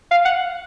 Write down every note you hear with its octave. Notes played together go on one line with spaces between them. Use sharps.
F5
F#5